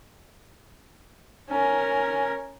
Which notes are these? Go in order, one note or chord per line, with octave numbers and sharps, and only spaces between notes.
C#4 A#4